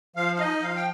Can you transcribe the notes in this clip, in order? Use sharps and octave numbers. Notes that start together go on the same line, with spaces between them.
F3 F5
F5
D#4 D#5
F3 F5
G5